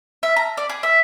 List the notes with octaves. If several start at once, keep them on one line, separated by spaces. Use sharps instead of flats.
E5
A#5
D5
G#4
E5